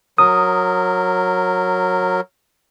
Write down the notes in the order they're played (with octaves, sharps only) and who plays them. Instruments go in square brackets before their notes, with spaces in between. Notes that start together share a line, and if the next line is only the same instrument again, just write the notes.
[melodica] F#3 A#4 [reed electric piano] D#6